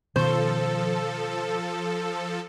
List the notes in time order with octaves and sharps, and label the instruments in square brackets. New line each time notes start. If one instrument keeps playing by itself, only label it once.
[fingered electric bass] B2 D#3 C#4 [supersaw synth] F3 A4 [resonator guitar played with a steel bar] C5